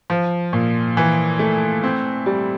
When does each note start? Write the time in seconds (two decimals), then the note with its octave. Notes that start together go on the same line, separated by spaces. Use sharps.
0.10 F3
0.53 A#2
0.97 E3
1.39 A3
1.84 C4
2.26 G3